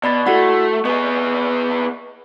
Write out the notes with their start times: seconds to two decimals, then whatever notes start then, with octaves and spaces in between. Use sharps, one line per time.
0.04 B2 D5 B5 A6
0.27 A3 E4 F#4 F#5
0.85 B3 G#4 D#5 C#6